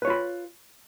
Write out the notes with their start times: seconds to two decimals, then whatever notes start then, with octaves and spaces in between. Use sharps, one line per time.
0.02 B4
0.05 C#5
0.07 F4
0.10 B5